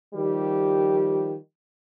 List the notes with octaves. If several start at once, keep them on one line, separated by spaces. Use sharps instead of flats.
D#3 F3 G3 G4